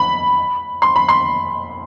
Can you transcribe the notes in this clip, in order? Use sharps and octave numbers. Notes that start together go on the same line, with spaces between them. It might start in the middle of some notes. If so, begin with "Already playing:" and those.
Already playing: B5
C6
B5
C6